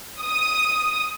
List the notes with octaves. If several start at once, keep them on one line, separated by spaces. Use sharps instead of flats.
D#6